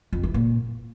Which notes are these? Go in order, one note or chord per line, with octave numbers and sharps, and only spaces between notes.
F2
E3
A#2